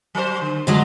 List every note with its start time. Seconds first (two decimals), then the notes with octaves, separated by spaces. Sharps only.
0.15 F#3 A#4 C5
0.41 D3
0.67 E2 D3 F#3 G#3 F4